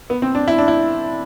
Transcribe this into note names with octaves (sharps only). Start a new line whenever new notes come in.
B3
C4
D4
E4
D4
E4